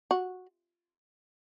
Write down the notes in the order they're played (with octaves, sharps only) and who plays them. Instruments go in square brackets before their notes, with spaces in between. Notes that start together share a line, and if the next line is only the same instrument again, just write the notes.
[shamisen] F#4